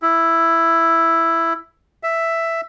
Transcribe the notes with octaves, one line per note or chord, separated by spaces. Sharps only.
E4
E5